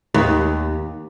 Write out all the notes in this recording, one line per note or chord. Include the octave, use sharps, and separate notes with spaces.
D#2